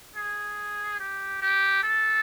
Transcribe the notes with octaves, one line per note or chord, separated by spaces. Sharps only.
G#4
G4
G4
A4